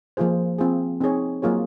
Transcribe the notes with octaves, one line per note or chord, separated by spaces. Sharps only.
F3 A#3 F4 G#4 C5
C4 F4 G#4
C4 D#4 G#4 C#5
F#3 A#3 F4 G#4 C#5